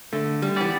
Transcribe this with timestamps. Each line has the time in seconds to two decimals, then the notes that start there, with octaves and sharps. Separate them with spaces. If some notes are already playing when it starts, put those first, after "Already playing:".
0.13 D3 A3
0.42 G3
0.56 E3 B3 G4 D5